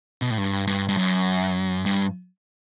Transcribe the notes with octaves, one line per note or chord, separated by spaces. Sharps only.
B2
A2
G2
G2
G2
F#2
G2